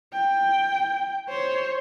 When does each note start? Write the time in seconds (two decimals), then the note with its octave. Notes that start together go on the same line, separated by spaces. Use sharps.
0.13 G5
1.29 C5 C#5